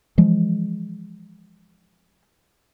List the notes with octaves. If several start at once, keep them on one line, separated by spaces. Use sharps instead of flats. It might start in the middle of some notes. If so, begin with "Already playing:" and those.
E3 F3 G#3